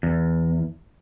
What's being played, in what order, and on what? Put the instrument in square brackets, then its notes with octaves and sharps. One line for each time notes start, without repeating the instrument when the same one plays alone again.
[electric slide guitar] E2